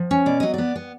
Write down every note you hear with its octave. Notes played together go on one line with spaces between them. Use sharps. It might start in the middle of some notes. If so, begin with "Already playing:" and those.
Already playing: F3
C#4
B2 D5
F#3 D#5
B3 D5
B3